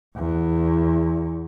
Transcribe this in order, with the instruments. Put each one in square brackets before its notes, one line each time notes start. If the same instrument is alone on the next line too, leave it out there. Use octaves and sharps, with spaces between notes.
[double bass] E2